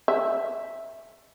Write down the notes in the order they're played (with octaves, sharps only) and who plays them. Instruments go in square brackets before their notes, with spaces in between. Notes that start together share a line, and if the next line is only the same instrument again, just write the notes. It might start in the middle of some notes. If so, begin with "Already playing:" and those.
[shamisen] E5